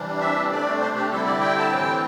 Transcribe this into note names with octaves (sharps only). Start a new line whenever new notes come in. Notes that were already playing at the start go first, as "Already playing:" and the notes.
Already playing: C3 E3 G3 D4
E5
C3 A3 D4 D5
C5
G4
D3 G3 C4 E4 A4
D5
G5
A5
A2 E3 C4 G5